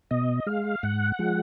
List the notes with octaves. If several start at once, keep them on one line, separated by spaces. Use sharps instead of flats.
B2 D#5
G#3 F5
G#2 F#5
F3 G#3